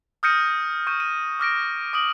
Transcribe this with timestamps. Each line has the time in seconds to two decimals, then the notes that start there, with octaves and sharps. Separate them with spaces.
0.23 D#6 F6 G6 A#6 C#7 D#7
0.87 C#6 G6 D#7
1.00 D#7
1.39 D6 F6 A#6 D7
1.93 D6 D#6 A#6 D7 F#7